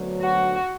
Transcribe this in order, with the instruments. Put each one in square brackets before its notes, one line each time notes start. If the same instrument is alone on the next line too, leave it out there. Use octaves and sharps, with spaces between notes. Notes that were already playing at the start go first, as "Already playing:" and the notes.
Already playing: [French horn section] D2 D3 F#3 B3
[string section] F#4